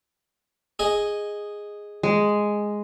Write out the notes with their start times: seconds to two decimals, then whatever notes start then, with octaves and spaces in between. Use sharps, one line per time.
0.79 G#4 D#5
2.03 G#3